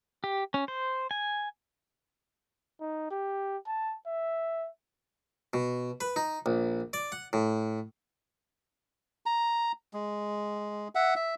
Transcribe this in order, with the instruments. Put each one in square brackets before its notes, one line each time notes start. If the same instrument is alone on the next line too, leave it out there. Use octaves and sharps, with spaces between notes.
[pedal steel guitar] G4
C#4
C5
G#5
[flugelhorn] D#4
G4
A5
E5
[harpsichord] B2
B4
D#4
A#1
D5
F#5
A2
[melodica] A#5
G#3
E5 F#5
E5